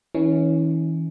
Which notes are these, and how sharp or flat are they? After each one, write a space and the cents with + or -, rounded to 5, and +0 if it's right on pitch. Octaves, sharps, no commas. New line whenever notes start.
E3 -35 C#4 +0